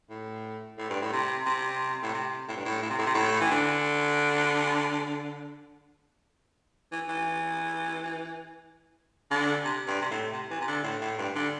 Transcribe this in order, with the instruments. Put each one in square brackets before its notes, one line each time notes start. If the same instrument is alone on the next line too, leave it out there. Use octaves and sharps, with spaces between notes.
[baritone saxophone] A2
A2
G2
A2
C3
C3
A2
C3
A2
G2
A2
A2
C3
A2
C3
A2
E3
D3
E3
E3
D3
C3
G2
C3
A2
C3
E3
C3
D3
A2
A2
G2
D3